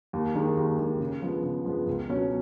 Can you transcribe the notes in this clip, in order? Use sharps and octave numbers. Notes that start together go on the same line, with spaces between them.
D#2
D#3 G#3
D#2
D#3 G#3
C#3
F3 G#3 B3
C#3
F3 G#3 B3
C#2
B2 F#3 C#4